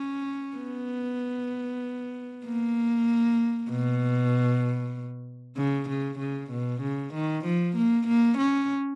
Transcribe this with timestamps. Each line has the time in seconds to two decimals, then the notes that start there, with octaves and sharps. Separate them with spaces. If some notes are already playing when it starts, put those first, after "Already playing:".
Already playing: C#4
0.57 B3
2.45 A#3
3.70 B2
5.57 C#3
5.89 C#3
6.19 C#3
6.51 B2
6.82 C#3
7.14 D#3
7.44 F3
7.76 A#3
8.07 A#3
8.38 C#4